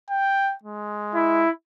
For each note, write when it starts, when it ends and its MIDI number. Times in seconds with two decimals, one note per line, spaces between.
0.10 0.54 79
0.63 1.45 56
1.15 1.50 64